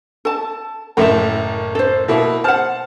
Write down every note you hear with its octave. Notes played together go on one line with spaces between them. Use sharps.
A4 A5
F#1 A2 A4 A#4 E5 G5
A4 C5
B2 A#3 E4
C5 F#5 A5 F6